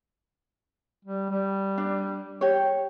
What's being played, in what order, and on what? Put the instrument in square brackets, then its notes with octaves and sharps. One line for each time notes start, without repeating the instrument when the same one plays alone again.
[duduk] G3
G3
[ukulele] D4
G4 C#5